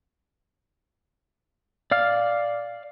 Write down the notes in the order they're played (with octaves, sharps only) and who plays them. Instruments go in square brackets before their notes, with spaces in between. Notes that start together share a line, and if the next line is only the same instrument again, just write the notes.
[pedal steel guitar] D5 F5 F6